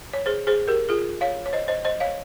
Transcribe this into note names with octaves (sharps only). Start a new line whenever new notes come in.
C#5
G#4 C5
G#4 C5
G4 A#4
F4 G#4
C#5 F5
C#5
C5 D#5
C5 D#5
C5 D#5
C#5 F5